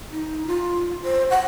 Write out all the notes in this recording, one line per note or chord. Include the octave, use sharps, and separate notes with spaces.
D#4
F4
C5
F#5